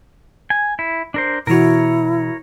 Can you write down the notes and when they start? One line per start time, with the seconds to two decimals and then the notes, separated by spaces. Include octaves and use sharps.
0.50 G#5
0.79 E4
1.14 D4 A#4 C5
1.47 B2 E3 E4 F#4 A#4 C#5